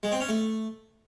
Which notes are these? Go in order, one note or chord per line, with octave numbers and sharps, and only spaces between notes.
G#3
C4
C#4
A3